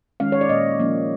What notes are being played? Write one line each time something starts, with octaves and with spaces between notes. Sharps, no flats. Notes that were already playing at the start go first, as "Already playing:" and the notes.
D#3 G#3 C#4 F5
C#5
D5
A#2 D#5
F3 A#3 C#4